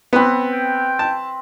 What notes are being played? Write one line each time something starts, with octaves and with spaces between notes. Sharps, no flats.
B3 C4 B4
G5
A5